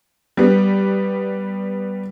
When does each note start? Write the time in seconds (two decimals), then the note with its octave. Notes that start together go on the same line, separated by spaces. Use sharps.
0.37 G3 B3